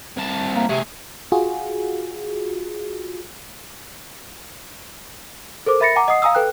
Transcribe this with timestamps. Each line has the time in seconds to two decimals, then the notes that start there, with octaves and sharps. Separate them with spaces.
0.17 C2 A5
0.55 A#3
0.69 C3 A3 G#4
1.32 F4 F#4 G#4
5.66 A4 A#4 C5 D6
5.80 A#4 E5 B5 A6 A#6 C#7
5.96 F#5 G#5 A#5 D6
6.08 D#5 F#5 D#6 C7
6.22 F5 G#5 A#5 D#6 E6
6.35 A4 B4 G5 F#6